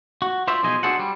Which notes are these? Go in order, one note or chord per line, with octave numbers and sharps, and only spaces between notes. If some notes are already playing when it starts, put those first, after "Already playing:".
F#4
F4 C5 D5 E5
B1 F3 G#4 C5 D#5 G#5
D4 F#4 G#4 A4 C5 F#5
G3